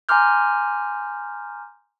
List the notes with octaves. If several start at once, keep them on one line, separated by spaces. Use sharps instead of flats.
G#5 A#5 C6 D6 F6 G6